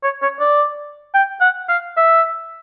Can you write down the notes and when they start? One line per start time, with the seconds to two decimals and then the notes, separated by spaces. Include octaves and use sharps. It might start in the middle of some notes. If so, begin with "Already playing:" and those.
0.04 C#5
0.22 C#5
0.40 D5
1.14 G5
1.41 F#5
1.68 F5
1.97 E5